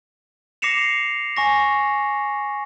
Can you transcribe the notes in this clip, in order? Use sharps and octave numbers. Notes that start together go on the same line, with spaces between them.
D6 A#6 C7 C#7 E7 F7
G#5 C#6 A#6